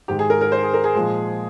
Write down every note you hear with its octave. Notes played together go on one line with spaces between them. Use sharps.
G#2 D#3 G#3 G4
G#4
A#4
A#4
C5
G#4
A#4
G#4
A#2 F3 G#3